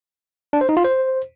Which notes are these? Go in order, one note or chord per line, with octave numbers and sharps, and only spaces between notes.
D4
C5
D#4
F4
C5